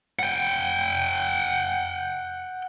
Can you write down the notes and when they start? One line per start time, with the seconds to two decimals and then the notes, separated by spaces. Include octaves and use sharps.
0.19 F#5 G5